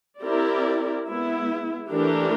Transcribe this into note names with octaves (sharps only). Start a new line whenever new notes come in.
C4 E4 G4 A#4 D5
G#3 B3 E4
E3 A3 D4 G4 A#4